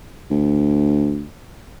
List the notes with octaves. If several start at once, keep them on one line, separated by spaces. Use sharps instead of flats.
D2